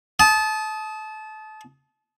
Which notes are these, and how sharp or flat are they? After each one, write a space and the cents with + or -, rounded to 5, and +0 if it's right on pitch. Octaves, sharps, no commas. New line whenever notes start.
A5 -25 D#6 +15